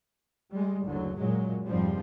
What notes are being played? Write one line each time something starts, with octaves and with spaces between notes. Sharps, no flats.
G3 G#3
F#1 D2 D3 F#3
F#2 A#2 F#3 G#3
F1 G#2 F3 G3 C4